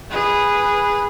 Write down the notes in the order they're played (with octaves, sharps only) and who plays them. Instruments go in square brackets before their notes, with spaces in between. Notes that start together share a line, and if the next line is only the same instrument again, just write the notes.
[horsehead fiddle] G#4 B4